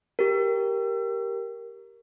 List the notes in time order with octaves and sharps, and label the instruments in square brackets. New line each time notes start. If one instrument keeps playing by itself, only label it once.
[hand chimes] G4 A#4